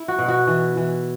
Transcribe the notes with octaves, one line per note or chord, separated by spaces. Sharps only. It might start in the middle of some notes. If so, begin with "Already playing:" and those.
Already playing: E4
F#4
B2
F#4
E3
E3